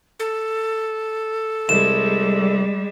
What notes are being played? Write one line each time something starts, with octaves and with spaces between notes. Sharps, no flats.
A4
C2 G3 G#3 E7